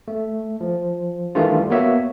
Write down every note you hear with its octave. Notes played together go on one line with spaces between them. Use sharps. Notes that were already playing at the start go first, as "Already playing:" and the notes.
A3
F3
D#3 E3 G3 A3 D4 F4
A#3 B3 F#4 C#5 E5